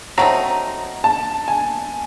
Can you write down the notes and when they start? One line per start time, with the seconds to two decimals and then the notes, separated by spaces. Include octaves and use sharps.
0.18 F#3 A3 C4 D#4 A#5
1.04 A5
1.48 G#5